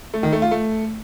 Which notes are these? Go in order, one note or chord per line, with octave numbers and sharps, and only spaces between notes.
A3
D#3
A3
F4
A3